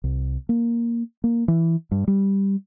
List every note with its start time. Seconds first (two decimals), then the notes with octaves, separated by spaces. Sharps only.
0.04 C2
0.49 A#3
1.24 A#3
1.48 E3
1.91 G2
2.08 G3